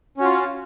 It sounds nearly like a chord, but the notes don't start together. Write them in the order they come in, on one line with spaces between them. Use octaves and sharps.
C#4 F#4 F4